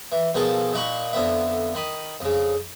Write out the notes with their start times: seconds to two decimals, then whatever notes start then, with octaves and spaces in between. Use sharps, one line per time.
0.12 E3
0.35 B2 D#3 F3 G#4 A4
0.73 A#2 D#4 F#4 B5 C#6
1.13 F2 D3 B3 E5
1.75 D#3 B5 D#6
2.20 F2 C#3